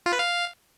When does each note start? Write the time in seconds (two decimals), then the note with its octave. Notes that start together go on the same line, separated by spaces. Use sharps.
0.06 F4
0.13 B4
0.19 F5